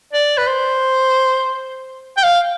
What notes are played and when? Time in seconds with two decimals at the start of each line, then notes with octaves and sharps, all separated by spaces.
0.13 D5
0.38 B4
0.47 C5
2.17 G5
2.23 F5